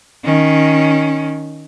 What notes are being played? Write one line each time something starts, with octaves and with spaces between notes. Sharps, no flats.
D#3 C#4